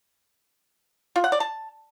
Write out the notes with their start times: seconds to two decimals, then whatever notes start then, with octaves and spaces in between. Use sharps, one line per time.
1.16 F4
1.24 F#5
1.32 D5
1.40 A5